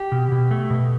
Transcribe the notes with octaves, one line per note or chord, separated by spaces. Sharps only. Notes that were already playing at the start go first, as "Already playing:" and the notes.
Already playing: G4
B2
B2
A3
B2